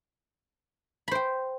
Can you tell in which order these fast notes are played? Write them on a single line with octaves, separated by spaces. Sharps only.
B5 C5 G5